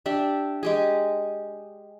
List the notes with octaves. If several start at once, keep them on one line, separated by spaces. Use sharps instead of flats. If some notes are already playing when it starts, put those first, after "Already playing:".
D4 G4 E5
G#3 G4 G#4